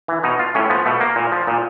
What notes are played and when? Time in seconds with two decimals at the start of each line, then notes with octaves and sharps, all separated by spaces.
0.08 E3
0.23 B2 D#4
0.39 F4
0.55 A2 C#4
0.70 F3 B3
0.86 B2 A3
1.00 A#3
1.16 A#2
1.32 F3
1.47 A#2